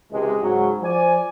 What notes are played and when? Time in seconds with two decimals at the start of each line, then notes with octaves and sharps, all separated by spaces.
0.11 C#2 C3 E3 G#3
0.41 G#2 C#3 F#3
0.83 F3 D5 G#5